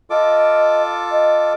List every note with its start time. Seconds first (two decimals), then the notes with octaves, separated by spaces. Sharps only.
0.10 F4 A4 D#5 D6
1.11 D#5